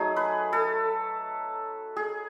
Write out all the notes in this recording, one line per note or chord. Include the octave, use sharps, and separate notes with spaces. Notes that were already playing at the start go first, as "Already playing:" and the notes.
Already playing: F#3 A3 D#4 G#4
B4
A4
G#4